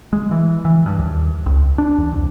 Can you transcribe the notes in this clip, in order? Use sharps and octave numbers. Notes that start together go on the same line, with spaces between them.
G#3
E3
E3
G2
D#2
C#2
D4
E2
C2